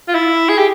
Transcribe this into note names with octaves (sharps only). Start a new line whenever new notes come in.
F4
E4
G#4
G4